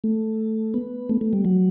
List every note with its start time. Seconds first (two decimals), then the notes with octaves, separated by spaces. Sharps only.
0.04 A3
0.74 B3
1.09 A3
1.21 A3
1.33 G3
1.45 F#3